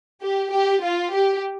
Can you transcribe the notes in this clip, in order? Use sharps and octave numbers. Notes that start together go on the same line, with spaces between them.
G4
G4
F4
G4